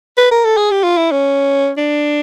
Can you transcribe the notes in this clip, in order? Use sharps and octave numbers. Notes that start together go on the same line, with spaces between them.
B4
A#4
A4
G#4
G4
F4
E4
C#4
D4